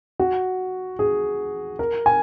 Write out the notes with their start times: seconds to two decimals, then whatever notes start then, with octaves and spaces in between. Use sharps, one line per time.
0.20 F#4
0.99 G#4
1.79 A#4
2.06 G#5